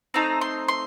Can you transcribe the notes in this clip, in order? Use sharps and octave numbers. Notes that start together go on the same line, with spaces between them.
A3 C4 D#4 A#5
C6
C6